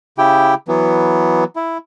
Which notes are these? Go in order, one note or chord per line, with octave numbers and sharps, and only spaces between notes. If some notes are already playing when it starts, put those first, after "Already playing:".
C#3 E4 G4 G5
E3 F#3 B3
E4